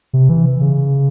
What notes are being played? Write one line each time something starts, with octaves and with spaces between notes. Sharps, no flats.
C3
E3
C#3